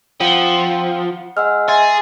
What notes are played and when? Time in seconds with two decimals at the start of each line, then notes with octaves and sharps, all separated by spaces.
0.20 F3 C4 F4 F#5 C#7
1.37 G#3 F#5 E6 F6
1.68 G#4 E5 C6 A6